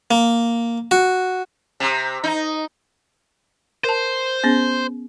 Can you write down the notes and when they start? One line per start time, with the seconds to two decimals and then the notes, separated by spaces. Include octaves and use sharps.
0.11 A#3
0.91 F#4
1.80 C3
2.24 D#4
3.84 A#4 C5 A5
4.44 B3 C#4 G#4